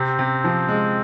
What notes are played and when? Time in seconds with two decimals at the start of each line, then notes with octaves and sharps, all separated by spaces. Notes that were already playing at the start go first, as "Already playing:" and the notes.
Already playing: C3 C4
0.19 C3
0.44 F3
0.69 G#3